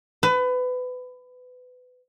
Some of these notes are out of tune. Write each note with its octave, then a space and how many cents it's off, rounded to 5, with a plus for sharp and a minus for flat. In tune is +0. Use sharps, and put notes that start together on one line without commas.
B4 +25